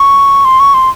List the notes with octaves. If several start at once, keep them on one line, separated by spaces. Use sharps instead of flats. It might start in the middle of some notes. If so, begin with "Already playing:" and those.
Already playing: C#6
C6
C#6
C6